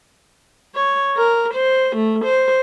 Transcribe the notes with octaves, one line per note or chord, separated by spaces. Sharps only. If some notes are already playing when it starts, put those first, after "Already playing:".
C#5
A#4
C5
A3
C5